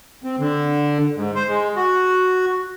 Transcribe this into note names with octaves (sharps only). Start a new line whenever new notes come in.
C4
D3
G#2
C5
G#3
F#4